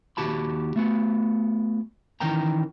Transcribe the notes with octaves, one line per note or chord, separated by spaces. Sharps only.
D#2 F#4 G4 A5 B5
A3 B3 F#4
D#3 E3 C#4 A#4 G5 A#5